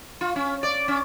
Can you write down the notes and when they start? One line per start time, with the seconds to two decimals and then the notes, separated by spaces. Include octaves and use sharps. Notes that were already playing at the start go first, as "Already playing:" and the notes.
0.21 F4
0.36 C#4
0.63 D5
0.88 C#4